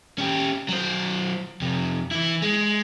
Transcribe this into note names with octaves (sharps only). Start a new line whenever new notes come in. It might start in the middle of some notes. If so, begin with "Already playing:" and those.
C#4 G4
F#3 C5
F2 C3
E3 E4
G#3